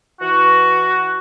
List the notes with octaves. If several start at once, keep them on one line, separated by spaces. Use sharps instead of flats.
E3 F#4